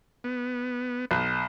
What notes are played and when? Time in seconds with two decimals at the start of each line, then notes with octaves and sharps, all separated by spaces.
0.24 B3
1.11 B1